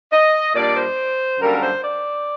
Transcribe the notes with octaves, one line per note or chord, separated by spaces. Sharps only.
D#5
A#2 G3 D4 D5
C5
F#2 D3 G3 A#3 D4 A#4
C5
D5